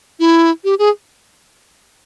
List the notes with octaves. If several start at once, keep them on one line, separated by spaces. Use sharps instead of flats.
E4
G4
G#4